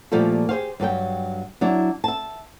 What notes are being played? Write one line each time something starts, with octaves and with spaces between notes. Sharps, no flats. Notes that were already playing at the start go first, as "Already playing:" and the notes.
A#2 F3 G3 A3 A#3 A4
G4 G#4 C5 F5
G2 F#3 A4 G5
F#3 D4 E4
E5 A5